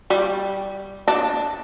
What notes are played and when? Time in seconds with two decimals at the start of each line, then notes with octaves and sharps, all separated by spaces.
0.10 G3
1.08 D4